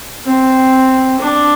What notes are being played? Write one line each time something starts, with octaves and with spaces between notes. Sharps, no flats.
C4
D4